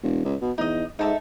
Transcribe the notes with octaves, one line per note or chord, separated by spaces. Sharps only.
E1
C#2
B2
E2 D#4 D#5
G#2 D#4 A4 E5